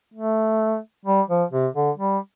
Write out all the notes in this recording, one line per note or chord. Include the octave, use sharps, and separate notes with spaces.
A3
G3
F3
C3
D3
G3